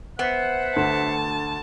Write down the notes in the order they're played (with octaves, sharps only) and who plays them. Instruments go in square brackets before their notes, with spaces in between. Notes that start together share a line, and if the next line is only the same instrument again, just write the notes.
[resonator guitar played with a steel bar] B3 [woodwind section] C5 E5 F#5
[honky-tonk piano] D2 [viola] A5